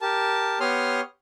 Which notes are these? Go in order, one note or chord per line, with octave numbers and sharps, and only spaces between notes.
G4 A#4 A5
B3 G4 C#5 C6 D#6 F6